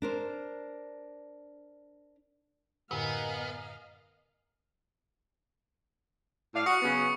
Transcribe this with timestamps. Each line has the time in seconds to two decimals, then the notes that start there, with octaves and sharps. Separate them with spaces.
0.02 D4 A#4 C5
2.91 F#2 A2 D3 B3 A#4 D#5 F5 G#5
6.54 A2 D5 F5
6.66 F#4 C#6 D#6 C#7
6.82 C#3 F#3 B3